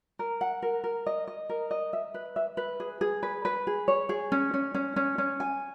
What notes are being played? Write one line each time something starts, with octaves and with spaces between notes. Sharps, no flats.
A#4
F#5
A#4
A#4
D#5
D#5
A#4
D#5
E5
B4
E5
B4
G#4
G#4
B4
B4
G#4
C#5
G#4
C#4
C#4
C#4
C#4
C#4
G#5